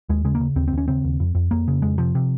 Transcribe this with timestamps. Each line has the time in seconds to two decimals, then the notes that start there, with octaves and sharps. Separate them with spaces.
0.09 D#2 G#3
0.25 C#3 G#3
0.35 A#3
0.40 C#3
0.56 D#2 C4
0.68 C4
0.73 D#2 C#4
0.88 C#3 C4
1.04 D#2
1.20 F2
1.35 F2
1.51 F2 A#3
1.68 C#3
1.82 F2 G#3
1.98 C3 F3
2.15 C3